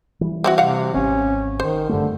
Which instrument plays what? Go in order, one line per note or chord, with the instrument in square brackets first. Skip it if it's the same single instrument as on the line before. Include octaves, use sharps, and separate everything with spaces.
[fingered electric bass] E3 G3
[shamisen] C4 E4 F#4
[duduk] C3 [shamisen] F5 F#5
[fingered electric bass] G#1 C4 [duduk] C#4
[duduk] D#3 [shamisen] C5
[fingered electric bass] G2 G3 A3 [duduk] D3